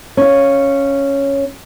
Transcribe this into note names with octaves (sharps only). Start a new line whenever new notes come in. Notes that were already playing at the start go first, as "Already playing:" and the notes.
C#4 F5